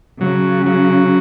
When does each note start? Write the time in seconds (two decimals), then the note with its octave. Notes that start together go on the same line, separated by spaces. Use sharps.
0.21 C#3 F#3
0.66 F#3